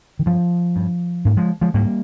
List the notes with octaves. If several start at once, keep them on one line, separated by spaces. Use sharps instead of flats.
D#3
G2 F3
G2
G#2 A#3
F3 G#3
F3 G#3
G#2 G3 A#3